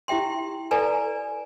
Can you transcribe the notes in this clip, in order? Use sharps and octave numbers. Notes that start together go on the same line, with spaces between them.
E4 G4 E5 G5 C6
A4 B4 D5 G#5 A#5